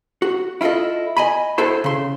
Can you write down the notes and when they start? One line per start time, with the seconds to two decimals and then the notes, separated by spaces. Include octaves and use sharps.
0.22 F#4
0.61 E4 F4 G#4 A4 D#5
1.17 D#5 G#5 B5
1.58 E4 F#4 A4 C5 C6
1.84 C#3 C6